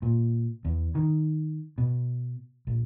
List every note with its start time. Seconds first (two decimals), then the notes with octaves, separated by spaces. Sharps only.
0.02 A#2
0.65 E2
0.95 D#3
1.78 B2
2.67 A#1